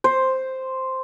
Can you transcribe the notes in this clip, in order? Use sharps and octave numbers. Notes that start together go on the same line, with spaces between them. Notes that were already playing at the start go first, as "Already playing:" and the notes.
C5